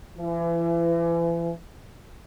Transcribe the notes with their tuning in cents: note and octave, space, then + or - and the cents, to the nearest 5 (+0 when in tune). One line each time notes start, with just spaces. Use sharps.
E3 +35